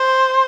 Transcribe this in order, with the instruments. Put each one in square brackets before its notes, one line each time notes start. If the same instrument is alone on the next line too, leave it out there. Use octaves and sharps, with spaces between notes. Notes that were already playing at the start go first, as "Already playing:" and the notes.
Already playing: [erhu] C5